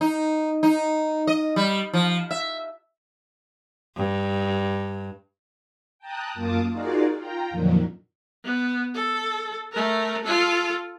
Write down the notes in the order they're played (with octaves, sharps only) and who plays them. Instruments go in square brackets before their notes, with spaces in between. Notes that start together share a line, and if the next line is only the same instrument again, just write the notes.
[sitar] D#4
D#4
D#5
G3
F3
E5
[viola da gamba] G2
[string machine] G5 A5 A#5 D#6 F#6
F#2 A#3 F4 A5 D6 D#6
D#4 F4 F#4 G#4 A#4 D5
F4 G5 A#5
F2 A#2 D3 D#3 F3 F#3
[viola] B3
A4
A3 A#4
F4 A4